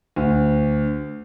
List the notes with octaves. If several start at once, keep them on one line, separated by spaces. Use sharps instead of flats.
D2